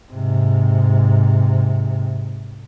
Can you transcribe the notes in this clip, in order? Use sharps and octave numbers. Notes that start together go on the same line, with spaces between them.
G#2 C3